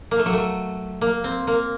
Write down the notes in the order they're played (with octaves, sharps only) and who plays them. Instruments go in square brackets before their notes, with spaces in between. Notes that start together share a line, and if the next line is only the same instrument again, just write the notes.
[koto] A#3
A3
F#3
A3
A#3
C4
A#3